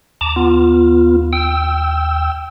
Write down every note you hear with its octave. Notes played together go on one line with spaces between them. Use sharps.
D#2 A5 A#5 D6
B3 F4
G5 E6